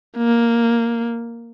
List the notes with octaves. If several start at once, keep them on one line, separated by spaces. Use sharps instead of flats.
A#3